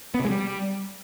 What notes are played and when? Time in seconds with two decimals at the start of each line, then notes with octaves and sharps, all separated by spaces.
0.14 B3
0.20 C3
0.25 G#3
0.30 G3